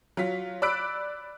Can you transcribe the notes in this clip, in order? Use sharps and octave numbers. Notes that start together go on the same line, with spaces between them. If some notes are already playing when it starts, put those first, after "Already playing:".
F#3 F4 F5 B6
D5 B5 E6 F#6 B6 D7